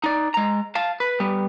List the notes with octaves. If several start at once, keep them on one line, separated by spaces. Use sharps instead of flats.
D#4 D5
G#3 A#5
F5 A5
B4
G3 B3